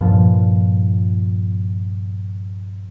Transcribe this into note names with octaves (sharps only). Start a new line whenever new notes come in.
G2 A#2 F3